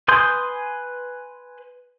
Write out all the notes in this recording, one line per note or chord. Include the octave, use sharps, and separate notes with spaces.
B4 G#5 C6 D#6 G6